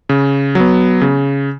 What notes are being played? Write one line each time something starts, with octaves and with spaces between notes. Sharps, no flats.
C#3
F#3 B3
C#3